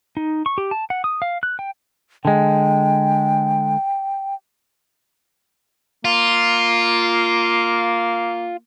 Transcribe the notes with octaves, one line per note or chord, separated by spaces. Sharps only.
D#4
C#6
G4
A5
F#5
D#6
F5
F#6
G5
D3 G#3 G5
A#3 F4